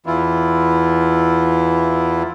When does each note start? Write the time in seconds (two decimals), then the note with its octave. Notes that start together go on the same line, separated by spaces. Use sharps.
0.06 E2 E3 E4 F4